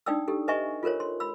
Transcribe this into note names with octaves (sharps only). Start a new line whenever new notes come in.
D4 D#4 D5 G5 D#6 E6
G4 A4
B4 D#5 E5 G#5 A#5 C#6
F4 A4 A#4 C5 C#5
C6
B5 E6